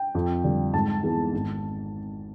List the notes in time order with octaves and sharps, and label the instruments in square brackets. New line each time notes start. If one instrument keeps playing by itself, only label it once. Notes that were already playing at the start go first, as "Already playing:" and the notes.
Already playing: [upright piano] G5
F2
D3 G3
G#2 A5
E3 G#3 B3
G#1